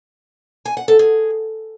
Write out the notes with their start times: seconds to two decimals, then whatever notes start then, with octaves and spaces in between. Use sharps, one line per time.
0.65 G#5
0.77 F#5
0.88 A4
0.99 G#4